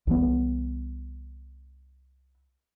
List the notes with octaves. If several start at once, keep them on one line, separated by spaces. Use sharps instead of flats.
C2 E3 B3